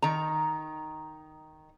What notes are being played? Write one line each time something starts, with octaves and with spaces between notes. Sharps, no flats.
D#3 A#5